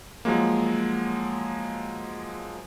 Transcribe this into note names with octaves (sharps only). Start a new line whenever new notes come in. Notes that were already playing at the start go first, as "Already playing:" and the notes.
F3 F#3 G#3 A#3